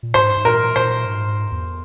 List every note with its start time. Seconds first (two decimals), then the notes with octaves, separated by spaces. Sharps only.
0.03 A#2
0.14 G#2 C5
0.37 G#2
0.45 A#2 A#4
0.76 A#2 C5
1.06 G#2
1.52 E2